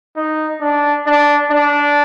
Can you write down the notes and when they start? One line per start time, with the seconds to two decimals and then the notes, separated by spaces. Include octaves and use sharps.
0.17 D#4
0.61 D4
1.06 D4
1.50 D4